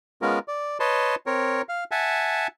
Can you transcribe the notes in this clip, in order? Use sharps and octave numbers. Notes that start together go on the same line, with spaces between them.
G#3 B3 C#4 F4 A#4
D5
B4 C#5 D#5 A5 C6
C4 A#4 C#5
F5
E5 F#5 G#5 A5